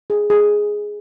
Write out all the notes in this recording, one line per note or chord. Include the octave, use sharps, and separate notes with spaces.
G#4
G#4